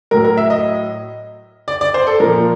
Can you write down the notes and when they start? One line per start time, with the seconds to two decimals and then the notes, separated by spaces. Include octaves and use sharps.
0.11 A2 F#3 A#4
0.25 A#4
0.37 E5
0.50 D#5
1.68 D5
1.81 D5
1.94 C5
2.07 A4
2.20 A#2 F3 A#4